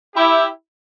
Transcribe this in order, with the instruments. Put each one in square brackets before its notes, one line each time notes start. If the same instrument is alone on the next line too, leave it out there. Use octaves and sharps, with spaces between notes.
[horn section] E4 G4